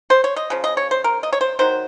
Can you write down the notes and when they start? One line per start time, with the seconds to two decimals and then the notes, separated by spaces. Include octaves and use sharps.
0.10 C5
0.24 C#5
0.36 D#5
0.50 C#3 F3
0.64 D#5
0.77 C#5
0.91 C5
1.04 A#4
1.23 D#5
1.33 C#5
1.41 C5
1.59 D#3 F#3 C5